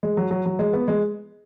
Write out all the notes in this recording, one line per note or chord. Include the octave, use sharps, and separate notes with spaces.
G#3
F#3
F#3
F#3
G#3
B3
G#3